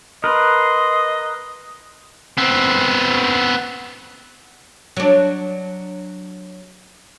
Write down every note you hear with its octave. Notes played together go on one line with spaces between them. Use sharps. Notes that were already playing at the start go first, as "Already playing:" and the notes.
A#4 B4 D#5 C6
B3 C4
F#3 D4